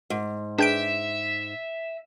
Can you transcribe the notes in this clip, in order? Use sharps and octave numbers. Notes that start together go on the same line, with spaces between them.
G#2
D4 G#4 B4 E5 G5 G6 D7